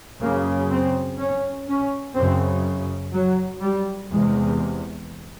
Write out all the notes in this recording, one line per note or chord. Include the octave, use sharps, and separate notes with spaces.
F#2 C#3 A#3
C4
C#4
C#4
F#2 C#3 C4
F#3
G3
E2 C3 G#3